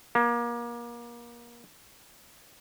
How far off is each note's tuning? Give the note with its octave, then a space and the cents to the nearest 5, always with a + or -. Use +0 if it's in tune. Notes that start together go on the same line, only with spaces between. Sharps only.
A#3 +30